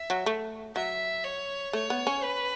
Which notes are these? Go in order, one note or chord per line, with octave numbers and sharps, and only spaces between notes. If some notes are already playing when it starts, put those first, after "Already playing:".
Already playing: E5
F#3
A3
F#3 E5
C#5
A3 C#5
B3
C#4
B4